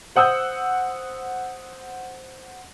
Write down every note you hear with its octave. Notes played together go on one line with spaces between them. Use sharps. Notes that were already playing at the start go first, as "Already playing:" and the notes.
C5 F#5 D#6 E6 G6